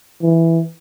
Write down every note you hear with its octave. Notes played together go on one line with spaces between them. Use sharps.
E3